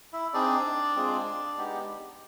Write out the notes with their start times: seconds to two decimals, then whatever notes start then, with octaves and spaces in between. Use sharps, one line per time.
0.13 E4 E5
0.33 C4 D4 D#4 G#4 D5
0.95 G#3 C4 F4 G#4
1.58 G#3 B3 D#4 G4